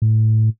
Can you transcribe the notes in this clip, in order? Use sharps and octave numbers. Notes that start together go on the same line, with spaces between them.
A2